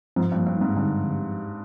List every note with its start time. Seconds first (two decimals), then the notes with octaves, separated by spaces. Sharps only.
0.16 G#2 F3
0.32 G2
0.36 A#3
0.46 G2
0.56 D#4
0.61 G#2
0.76 G2 D3
0.97 F3